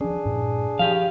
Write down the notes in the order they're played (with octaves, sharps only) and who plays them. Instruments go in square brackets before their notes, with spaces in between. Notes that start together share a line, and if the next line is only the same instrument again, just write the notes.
[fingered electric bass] F3 C#4 [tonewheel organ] D4 G#4
[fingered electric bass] G2 A#2
[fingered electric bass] F3 [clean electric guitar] G4 F5